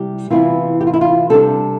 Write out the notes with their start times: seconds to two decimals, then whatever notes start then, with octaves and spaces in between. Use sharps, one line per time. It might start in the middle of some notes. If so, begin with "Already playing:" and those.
Already playing: C3 G3 E4 G4
0.30 C3 E3 B3 E4 F4
0.81 G4
0.87 F4
0.94 E4
1.01 F4
1.30 C3 G3 D4 A4